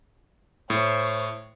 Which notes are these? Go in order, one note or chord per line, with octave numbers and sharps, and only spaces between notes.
A2 C5 C#5